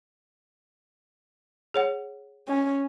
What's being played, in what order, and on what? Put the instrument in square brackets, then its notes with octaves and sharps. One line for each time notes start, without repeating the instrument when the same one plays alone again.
[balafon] G#4 C#5 F#5
[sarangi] C#4